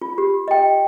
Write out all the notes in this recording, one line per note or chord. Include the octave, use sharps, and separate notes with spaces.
F4
G4
D#5 G5